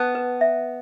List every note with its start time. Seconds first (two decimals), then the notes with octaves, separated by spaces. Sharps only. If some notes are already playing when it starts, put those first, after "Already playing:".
Already playing: B3 A5
0.15 B4
0.41 E5